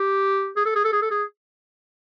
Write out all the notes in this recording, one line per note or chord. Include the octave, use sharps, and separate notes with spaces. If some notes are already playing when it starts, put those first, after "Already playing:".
Already playing: G4
G#4
A4
G#4
A4
G#4
A4
G#4